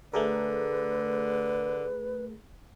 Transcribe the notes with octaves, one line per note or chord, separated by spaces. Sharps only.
D3 A3 G#4 A#4 B4